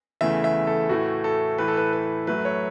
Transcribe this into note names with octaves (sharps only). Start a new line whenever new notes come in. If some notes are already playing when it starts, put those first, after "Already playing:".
E2 C#3 E3 A3 E5
E5
A4
A2 E3 A3 F#4
A4
A2 E3 A3 B4
A4
B4
B4
F#2 F#3 A3 B4
C#5